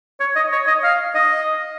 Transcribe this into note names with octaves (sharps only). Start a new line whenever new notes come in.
C#5
D#5
C#5
D#5
F5
D#5